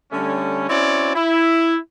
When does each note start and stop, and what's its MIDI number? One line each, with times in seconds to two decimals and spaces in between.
0.11 0.66 50
0.11 0.66 55
0.11 0.66 57
0.11 0.66 61
0.68 1.11 60
0.68 1.11 61
0.68 1.11 64
0.68 1.11 66
0.68 1.11 73
0.68 1.11 74
1.15 1.76 64